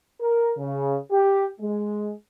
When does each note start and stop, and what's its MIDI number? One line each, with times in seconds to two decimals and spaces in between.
0.21 0.52 70
0.58 0.96 49
1.12 1.45 67
1.61 2.12 56